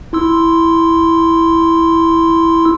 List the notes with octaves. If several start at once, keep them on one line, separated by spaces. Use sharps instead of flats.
E4 C6 E6